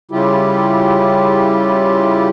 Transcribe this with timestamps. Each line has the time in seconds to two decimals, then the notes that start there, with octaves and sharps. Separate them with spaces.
0.11 C#3 G3 E4 F4 G4